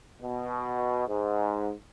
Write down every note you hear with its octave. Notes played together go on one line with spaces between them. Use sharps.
B2
G#2